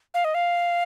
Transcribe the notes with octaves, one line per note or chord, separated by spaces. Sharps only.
F5
D#5
F5